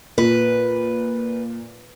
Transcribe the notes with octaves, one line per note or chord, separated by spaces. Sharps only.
A#2 B4